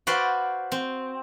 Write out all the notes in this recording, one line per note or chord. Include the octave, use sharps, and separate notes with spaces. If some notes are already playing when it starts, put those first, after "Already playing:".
F#4 B4 C5 D5 F5 G5
C4